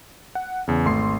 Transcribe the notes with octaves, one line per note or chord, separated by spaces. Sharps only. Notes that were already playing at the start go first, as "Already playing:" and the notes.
F#5
E2 C#3
G#1 A3 C6 C7